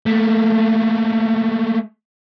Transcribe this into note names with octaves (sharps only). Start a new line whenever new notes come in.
A3 A#3